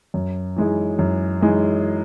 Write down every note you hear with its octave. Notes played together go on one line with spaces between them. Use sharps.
F#2
E3 G#3 D#4 G#4
F#2
E3 G#3 D#4 G#4